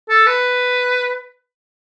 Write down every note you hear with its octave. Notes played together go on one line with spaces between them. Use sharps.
A4
B4